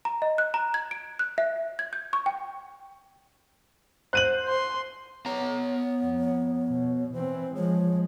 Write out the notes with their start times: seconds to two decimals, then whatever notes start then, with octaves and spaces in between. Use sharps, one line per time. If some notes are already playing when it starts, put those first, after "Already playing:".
0.05 A#5
0.22 D#5
0.38 F#6
0.54 A#5
0.74 G#6
0.91 D7
1.19 F#6
1.38 E5
1.79 G#6
1.93 G6
2.13 C#6
2.26 G5
4.13 C5 F#6 D#7 F#7
4.48 C6
5.26 B3 C#5 A#5
6.01 F2
6.68 B2
7.14 E3 C4 C5
7.55 F3 G#3 C#5